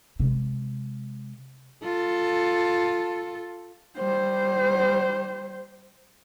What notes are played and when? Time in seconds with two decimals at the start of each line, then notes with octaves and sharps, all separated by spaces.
0.20 C3 G#3
1.84 F4 A4
3.98 G3 C5